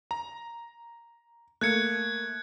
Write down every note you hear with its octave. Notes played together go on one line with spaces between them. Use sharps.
A#5
A3 A#3 F#6 G#6 C#7